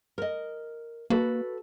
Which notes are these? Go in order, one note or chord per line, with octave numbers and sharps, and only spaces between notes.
A#4 D#5
A#3 F#4 A4 B4